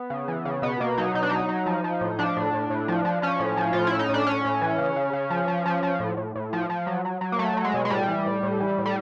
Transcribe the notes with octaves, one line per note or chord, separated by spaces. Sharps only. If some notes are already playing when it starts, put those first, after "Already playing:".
Already playing: B3
C#3
E3
C#3
B2 B3
B2 A#3
F#3 D#4
B2 D#4
D4
F#3 D#4
F#3
F3
F3
A2
F3 D4
A2
A2
A2
F3
F3
F3 C#4
A2
F3
A2 F4
A2 E4
D#4
A2
D4
A2 C#4
A2
E3
C#3
C#3
C#3
F3
F3
F3
F3
A2
A2
A2
F3
F3
F#3
F#3
F#3
A#3
F#3 A3
F#3
G#3
B2
G#3
A2 G3
E3
A2
A2
E3
A2
G3